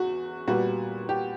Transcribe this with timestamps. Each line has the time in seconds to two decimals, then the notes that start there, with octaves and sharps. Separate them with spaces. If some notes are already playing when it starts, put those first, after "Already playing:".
Already playing: E2 F#4
0.47 A#2 G3 B3 F#4
1.09 G4